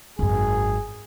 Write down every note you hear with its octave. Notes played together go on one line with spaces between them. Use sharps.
G#1 F#2 G#4